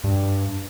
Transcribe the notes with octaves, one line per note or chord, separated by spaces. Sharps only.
G2